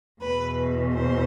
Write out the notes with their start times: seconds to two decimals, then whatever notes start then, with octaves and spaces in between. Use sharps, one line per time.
0.21 E2 B2 B4
0.93 C5